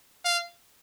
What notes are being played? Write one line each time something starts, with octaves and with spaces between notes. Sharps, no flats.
F5